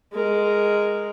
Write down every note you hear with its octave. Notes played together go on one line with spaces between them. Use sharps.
G#3 A#4